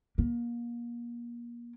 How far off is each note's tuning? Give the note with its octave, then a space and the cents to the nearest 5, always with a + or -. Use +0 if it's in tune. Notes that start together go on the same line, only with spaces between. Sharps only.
A#3 +30